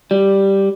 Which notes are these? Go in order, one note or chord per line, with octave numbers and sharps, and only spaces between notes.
G3